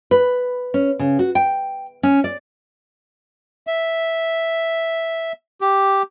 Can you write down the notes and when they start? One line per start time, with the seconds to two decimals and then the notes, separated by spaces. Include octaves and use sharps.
0.11 B4
0.74 C#4
0.99 C#3
1.19 F#4
1.35 G5
2.03 C#4
2.24 D5
3.67 E5
5.61 G4